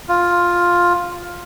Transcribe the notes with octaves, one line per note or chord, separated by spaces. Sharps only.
F4